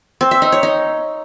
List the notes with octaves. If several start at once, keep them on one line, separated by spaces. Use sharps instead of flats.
C4
E5
D#4
C#5
D#4